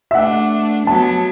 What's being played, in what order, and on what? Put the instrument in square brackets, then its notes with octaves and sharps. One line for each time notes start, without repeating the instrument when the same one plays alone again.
[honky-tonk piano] E5
[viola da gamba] A3 D4 [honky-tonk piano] F#5
[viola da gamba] F#3 B3 [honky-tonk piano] A5